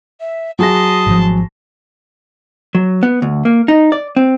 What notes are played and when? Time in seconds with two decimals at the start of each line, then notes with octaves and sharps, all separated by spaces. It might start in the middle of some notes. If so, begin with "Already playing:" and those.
0.20 E5
0.59 F#3 G#4 A5 C6 D#6 A#6
1.07 G#1 F3
2.75 F#3
3.03 B3
3.22 D2
3.45 A#3
3.68 D#4
3.92 D5
4.16 C4